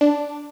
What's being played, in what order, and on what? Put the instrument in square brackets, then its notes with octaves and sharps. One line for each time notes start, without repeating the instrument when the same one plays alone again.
[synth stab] D4